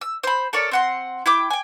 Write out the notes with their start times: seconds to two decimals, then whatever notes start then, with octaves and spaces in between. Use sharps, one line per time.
0.01 E6
0.23 C5 B5
0.53 A4 A#4 C#5 D5
0.71 C4 F#5 C6
1.26 E4 G5 D6
1.50 G5 G#5